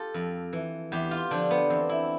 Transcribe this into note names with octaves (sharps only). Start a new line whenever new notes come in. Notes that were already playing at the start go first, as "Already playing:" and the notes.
Already playing: F4 G4 A4
F2
E3
E2 G4
F4
D3 F3 D4
B3
E2 C4
E4